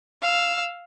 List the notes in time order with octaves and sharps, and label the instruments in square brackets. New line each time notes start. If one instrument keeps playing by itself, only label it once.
[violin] F5 E6